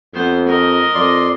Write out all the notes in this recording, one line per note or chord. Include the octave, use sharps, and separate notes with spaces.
F2 B3 C5
A#4 D#5
F2 D5 C6